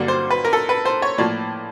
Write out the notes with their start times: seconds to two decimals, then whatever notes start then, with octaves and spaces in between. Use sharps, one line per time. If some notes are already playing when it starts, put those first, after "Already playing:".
Already playing: G2 D3 F#3 A#3 D5
0.08 C5
0.30 B4
0.45 A#4
0.53 A4
0.69 B4
0.85 C5
1.02 C#5
1.18 A2 F3 A#3 D5